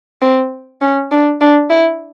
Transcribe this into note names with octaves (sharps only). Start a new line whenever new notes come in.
C4
C#4
D4
D4
E4